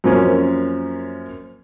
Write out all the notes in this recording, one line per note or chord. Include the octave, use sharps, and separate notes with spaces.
F#2 F3 A#3 C4 C#4